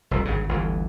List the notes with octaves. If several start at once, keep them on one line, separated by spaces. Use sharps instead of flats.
F1 C2
G#1 G2 C#3
G1 D2 E3